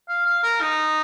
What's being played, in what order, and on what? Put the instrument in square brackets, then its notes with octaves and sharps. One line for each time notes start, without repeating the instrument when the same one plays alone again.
[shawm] F5
F5
A#4
D#4